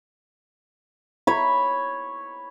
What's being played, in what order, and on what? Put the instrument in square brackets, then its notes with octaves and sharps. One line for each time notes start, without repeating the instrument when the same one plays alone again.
[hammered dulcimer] C#5 B5